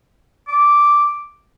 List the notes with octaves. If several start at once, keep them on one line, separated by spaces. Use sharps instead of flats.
D6